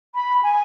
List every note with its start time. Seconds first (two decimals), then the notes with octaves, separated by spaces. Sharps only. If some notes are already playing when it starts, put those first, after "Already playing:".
0.15 B5
0.43 G#5